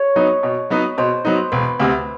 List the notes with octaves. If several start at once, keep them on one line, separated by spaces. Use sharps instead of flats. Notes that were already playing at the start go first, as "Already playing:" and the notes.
Already playing: C#5
F#3 B3 D#4
B2
F#3 B3 D#4
B2 C5
F#3 B3 D#4
E1 B4
D2 C3